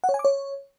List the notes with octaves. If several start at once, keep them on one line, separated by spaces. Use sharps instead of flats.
F#5
C#5
G#5
D6
C#5